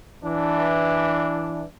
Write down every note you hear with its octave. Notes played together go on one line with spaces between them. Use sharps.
E3 D4